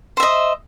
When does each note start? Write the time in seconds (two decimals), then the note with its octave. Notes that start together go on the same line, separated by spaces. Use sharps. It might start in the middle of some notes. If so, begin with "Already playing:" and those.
0.17 C5
0.20 E5
0.23 D#5